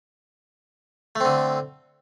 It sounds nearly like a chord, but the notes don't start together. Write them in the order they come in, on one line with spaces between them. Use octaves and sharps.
A3 C4 D3